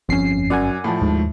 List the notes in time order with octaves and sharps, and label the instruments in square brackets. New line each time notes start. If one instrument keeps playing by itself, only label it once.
[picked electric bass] G1 C#4 [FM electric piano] F2 C7
[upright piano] F#2 [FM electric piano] D5 F#5 G#5
[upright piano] A2 F3
[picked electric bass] D#2 [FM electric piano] G#2